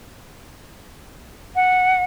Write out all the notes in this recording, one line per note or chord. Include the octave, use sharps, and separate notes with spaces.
F#5